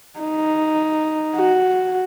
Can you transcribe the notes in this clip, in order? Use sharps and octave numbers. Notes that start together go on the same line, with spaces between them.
D#4
F#4